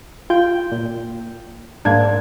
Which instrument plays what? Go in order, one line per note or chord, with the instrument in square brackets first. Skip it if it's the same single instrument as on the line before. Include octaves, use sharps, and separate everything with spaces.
[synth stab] F4 [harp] G5
[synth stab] A#2
[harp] G#2 G#6 [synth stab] A#3 D4